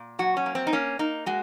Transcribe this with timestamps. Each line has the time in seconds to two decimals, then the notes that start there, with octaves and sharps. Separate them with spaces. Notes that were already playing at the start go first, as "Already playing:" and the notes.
Already playing: A#2
0.19 F#3 F#4
0.37 C#4
0.46 A#3
0.55 C4
0.67 D#4
0.73 A#3 C#4
0.99 A#3 D#4
1.26 G#3 F#4